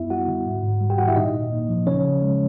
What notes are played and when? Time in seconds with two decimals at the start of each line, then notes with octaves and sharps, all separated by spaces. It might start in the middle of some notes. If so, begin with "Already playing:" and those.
Already playing: F#2 B3 E4 E5
0.10 G3 F#4 F#5
0.28 D3
0.46 G#2
0.63 G#2
0.81 G3
0.90 G4 G5
0.98 D#3 F#4 F#5
1.07 E4 E5
1.16 A#2 D#4 D#5
1.33 A#2
1.52 A#3
1.69 F3
1.87 C#3 C#4 C#5
2.05 C#3
2.22 G#3